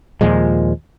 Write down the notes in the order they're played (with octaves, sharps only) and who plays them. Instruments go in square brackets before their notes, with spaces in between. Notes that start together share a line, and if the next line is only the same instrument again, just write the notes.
[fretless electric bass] D#2 A#2 F3 G#3